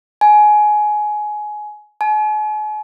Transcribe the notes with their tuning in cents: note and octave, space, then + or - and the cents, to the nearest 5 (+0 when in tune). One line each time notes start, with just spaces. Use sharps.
G#5 +20
G#5 +45